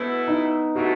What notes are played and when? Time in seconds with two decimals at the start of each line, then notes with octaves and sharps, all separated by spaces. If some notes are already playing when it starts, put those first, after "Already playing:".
Already playing: B2 A3 B3 E4
0.28 D#4
0.75 C3 E3 A3 F#4